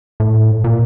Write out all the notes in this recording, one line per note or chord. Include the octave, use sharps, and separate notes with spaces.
A2
A#2